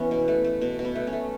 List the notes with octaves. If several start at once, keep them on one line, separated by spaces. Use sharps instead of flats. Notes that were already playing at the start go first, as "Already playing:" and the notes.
Already playing: E3 B3 C#4
B2
A3
A3
B2
B2
B3
A3
C#4
A3